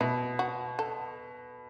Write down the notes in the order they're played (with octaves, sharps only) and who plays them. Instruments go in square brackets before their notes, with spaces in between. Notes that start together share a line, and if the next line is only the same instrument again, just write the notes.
[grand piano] B2 [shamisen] E4
[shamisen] F#4
A4